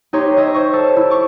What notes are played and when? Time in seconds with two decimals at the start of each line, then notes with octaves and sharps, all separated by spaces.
0.13 D#4 G4 C#5 C6
0.37 C#5 D#5 E5
0.55 C5 C#6
0.73 A4
0.96 E4
1.10 C#6 D6